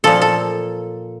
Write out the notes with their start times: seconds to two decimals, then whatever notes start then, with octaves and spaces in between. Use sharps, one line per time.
0.04 A#2 F3 A4
0.21 A4